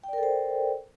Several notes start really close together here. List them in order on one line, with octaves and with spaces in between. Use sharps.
G5 D5 A#4 A4 C5